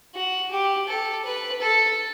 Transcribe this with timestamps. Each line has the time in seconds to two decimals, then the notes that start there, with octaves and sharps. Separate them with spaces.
0.15 F#4
0.51 G4
0.88 A4
1.25 B4
1.62 A4